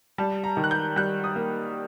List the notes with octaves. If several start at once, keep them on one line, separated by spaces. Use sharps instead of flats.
G3 A5
A#5
D#3
F#6
G6
G3 F#6
D#6
A#3